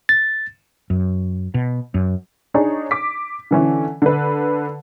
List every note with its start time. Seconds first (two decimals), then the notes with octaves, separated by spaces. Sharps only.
0.09 A6
0.90 F#2
1.54 B2
1.94 F#2
2.54 D4 D#4 G#4 C#5
2.91 D6 B6
3.51 D3 E3 C#4
4.02 D3 B4